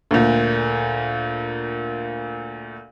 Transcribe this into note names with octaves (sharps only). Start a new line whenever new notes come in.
D2 A#2